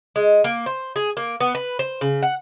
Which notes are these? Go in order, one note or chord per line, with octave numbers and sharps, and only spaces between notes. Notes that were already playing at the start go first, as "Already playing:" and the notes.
G#3
A#3
C5
G#4
A#3
B3
B4
C5
C#3
F#5